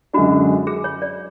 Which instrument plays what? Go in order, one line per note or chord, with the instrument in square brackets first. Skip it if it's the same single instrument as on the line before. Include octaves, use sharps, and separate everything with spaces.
[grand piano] F#2 D3 G#3 D4 [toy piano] F#4
[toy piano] G#4
C#5
D5